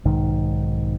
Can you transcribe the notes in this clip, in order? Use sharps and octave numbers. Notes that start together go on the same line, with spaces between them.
B1 G#2 D#3